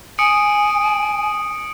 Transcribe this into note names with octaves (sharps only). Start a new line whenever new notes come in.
G#5 D#6 C#7 D7